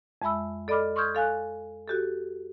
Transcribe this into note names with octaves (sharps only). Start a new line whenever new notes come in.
F2 G#3 E5 B5 E6
A4 D5 D#5 B5 D6 F6
C6 C#6 D#6 F6 G6 G#6
A4 F5 G#5 F#6
F#4 G4 A4